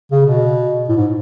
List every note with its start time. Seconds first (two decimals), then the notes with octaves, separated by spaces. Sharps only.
0.11 C#3
0.26 B2
0.89 A2
0.96 G#2